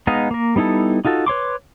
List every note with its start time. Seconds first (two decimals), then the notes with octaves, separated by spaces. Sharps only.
0.07 G#3 B3 D#4 D#5 F5
0.31 A#3 A#4
0.56 G3 B3 D#4 E4 A4
1.05 D#4 F4 F#4 A4
1.26 B4 C#5 C6 D6